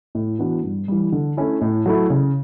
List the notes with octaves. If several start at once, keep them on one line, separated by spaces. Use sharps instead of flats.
A2
E3 B3 D4 F#4
G2
E3 G3
D3
A3 C#4 E4
A2
F#3 A3 E4
C#3